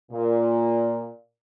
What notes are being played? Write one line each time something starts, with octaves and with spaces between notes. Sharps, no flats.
A#2